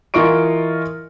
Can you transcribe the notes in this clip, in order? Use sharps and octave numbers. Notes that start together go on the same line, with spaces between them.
E3 F4 A#4 D#5 C#6 D7